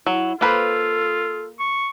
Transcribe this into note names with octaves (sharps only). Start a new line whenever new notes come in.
F#3 E4
A#3 F4 A4 B4 C5
C#6